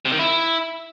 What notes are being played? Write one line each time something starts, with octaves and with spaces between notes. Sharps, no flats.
C3
D#3
E4